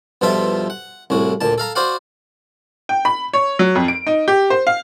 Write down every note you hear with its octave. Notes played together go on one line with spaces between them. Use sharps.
G2 B2 F3 F4 A4 E5
F#5
C2 A2 F#4
D2 A#2 A5
A4 F5 A#5
F#4 C5 D5 F5 F#5
G5
B5
C#5
F#3
F2
D7
D#4
G4
C5
F5